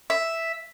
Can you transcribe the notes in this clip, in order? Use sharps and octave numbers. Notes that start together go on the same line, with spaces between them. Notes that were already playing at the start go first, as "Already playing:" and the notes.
E5